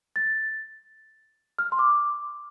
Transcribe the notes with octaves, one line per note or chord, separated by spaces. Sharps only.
A6
F6
C6
D6